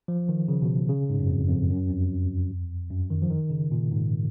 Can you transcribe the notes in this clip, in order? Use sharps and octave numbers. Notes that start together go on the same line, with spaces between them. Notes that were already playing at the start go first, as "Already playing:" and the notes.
F3
D#3
C#3
B2
C#3
G#2
F#2
F2
F2
F#2
F2
F#2
D#3
F3
D#3
C#3
A#2
G#2